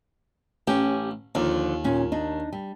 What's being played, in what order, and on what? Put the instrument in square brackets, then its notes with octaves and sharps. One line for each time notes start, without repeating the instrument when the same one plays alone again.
[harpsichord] A1 [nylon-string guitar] C#4 G4
[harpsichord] D#2 [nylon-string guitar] D3 F3 D5
[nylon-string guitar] A#2 C#4
D4 D#4
G3